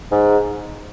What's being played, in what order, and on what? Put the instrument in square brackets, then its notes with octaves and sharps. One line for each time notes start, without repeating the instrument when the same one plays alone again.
[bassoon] G#2